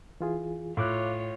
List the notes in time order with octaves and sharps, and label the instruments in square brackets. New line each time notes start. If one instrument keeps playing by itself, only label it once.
[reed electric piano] E3 F4 G#4
[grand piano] A2 [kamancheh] F4 C#5 [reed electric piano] F5 D6 F#6